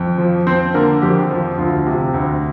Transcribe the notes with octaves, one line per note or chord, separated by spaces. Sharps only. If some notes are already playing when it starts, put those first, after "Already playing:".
Already playing: F2
F3
C4 C5
D3 A#3 A#4
F2 G4
F3
D2 F4
C3
D2